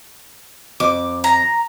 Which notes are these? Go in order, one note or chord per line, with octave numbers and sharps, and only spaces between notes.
F2 D6
A#5